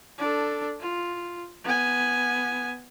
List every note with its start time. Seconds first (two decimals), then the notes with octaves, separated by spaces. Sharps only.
0.18 D4 A4
0.80 F4
1.64 B3 G#5